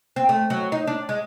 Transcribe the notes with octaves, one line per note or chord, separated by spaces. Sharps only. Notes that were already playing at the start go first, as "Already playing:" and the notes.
C4
A3
F#3
D#4
D4
G#3